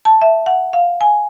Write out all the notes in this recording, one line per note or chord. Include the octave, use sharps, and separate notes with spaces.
A5
E5
F#5
F5
G#5